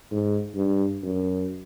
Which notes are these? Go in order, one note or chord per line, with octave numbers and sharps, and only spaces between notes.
G#2
G2
F#2